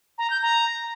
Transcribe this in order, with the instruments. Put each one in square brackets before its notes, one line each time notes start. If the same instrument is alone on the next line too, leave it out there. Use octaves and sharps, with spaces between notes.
[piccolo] A#5
G6
A#5